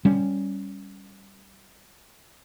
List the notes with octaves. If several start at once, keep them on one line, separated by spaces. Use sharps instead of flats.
G3 C#4